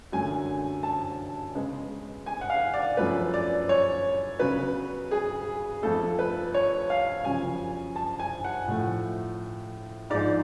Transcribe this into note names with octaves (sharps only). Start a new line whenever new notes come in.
F#2 D3 F#3 A3 G#5
A5
C#3 G#3 B3
G#5
F#5
F5
D5
F#2 F3 A3 B4
D5
C#5
C#3 F#3 B3 B4
G#4
F2 F3 A3 A4
B4
C#5
F5
F#2 C#3 F3 G#5
A5
G#5
F#5
A2 F3 A3
G#2 F3 G#3 D5